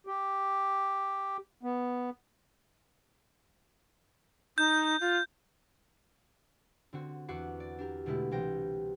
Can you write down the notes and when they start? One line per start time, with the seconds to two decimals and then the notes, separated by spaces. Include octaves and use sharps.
0.07 G4
1.63 B3
4.58 D#4 G6
5.01 F4
6.93 D3 C4 F#4
7.28 E2 F#4 F#5 D6 C7
7.60 D5
7.78 D4 G4 A#4
8.06 B2 D3 G#3 A3 E4 G4
8.31 C2 E3 G4 C5 G5 A#6